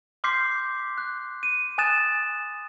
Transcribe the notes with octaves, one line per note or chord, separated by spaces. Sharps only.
C6 D6 F6 G6 B6 C7
F#6
D#7
G#5 D#6 F#6 A6 E7